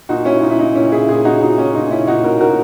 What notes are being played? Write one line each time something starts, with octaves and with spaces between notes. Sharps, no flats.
A#2 D#4 F#4
C#4 E4
A#2 D#4
E4
D#4
A#2 C#4 E4
E4 G#4
A#2 E4 G#4
D#4 F#4
A#2 D#4
C#4
A#2 D#4
C#4 E4
A#2 D#4 F#4
F#4 A#4
A#2 F#4 A#4